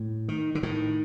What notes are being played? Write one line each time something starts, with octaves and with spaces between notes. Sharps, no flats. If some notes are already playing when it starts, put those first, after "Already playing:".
Already playing: A2
D#3
D3
A2 D#3